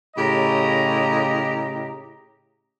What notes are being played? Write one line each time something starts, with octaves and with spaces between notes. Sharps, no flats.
A2 C#3 G4 D#5 A#5